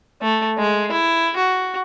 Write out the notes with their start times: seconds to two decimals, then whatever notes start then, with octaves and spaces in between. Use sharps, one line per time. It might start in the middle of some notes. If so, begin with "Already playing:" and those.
0.22 A3
0.58 G#3
0.92 E4
1.37 F#4